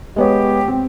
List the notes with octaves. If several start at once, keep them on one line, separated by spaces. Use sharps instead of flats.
G#3 B3 G4 C#5
C4